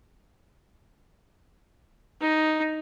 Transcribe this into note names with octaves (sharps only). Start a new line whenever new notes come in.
D#4